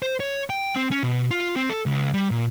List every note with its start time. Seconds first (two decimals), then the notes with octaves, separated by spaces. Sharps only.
0.02 C5
0.20 C#5
0.50 G5
0.76 C4
0.91 C#4
1.03 B2
1.31 F4
1.56 C4
1.70 A4
1.86 C#2
2.13 G3
2.31 A#2